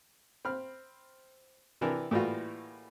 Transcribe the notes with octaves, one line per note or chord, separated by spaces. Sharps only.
C4 B5 F6
C3 E3 D4 A#4
A2 E3 G3 A#3 F4 F#4